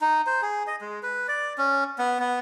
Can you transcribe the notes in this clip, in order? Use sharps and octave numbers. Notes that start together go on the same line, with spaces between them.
D#4
C5
G#4
D#5
G#3
B4
D5
C#4
B3
B3